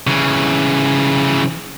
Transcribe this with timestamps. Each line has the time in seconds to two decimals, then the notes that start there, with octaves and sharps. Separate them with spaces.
0.07 C#3 E3